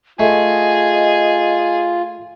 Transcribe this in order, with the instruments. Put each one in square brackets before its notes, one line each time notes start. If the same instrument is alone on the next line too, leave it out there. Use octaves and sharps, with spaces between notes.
[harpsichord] A3 [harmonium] F4 [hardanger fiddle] G#4 [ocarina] D#5